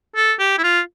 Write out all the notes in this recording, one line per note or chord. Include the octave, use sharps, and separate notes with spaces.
A4
G4
E4
F4